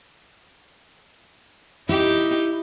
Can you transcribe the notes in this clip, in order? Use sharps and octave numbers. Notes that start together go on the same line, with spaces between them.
D#4 E4 G4